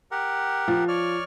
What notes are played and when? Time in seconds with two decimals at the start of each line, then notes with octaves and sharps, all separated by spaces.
0.11 G4 A#4 F#5
0.68 F3
0.88 C#5 D5 F6